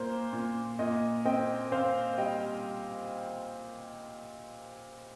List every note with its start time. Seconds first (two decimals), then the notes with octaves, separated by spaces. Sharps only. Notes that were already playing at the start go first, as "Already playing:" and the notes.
Already playing: A#2 A#3 C5 A#5
0.33 A#2
0.79 A#2 D#5
1.25 C4 D#5 G5
1.72 C4 C5 F5
2.18 G3 D#5 G5